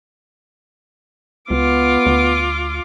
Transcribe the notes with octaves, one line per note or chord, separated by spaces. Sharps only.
C#2 B3 F4 D6
D2